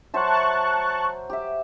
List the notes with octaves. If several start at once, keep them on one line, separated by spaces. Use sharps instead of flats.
F#3 C5 E5 A5 C#6 F#6
G4 E5